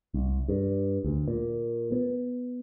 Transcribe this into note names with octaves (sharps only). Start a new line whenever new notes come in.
C2
G2
D2
A#2
B3